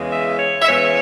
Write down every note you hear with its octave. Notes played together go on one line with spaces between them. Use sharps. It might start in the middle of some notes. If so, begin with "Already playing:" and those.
Already playing: E2 C#3 E3 G#3
E5
C#5
E5
E2 C#3 E3 G#3 C#5